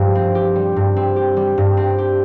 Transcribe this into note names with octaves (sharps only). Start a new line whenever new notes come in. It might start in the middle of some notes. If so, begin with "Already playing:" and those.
Already playing: G2 F3 G4
C4
G4
G3
G2
C4
G4
G3
G2
C4
G4